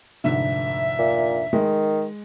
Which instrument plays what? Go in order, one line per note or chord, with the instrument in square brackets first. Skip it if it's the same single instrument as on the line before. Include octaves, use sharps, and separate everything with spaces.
[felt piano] F1 G#2 D3 [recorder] E5
[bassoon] A#2
[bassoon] D#3 [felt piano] G#3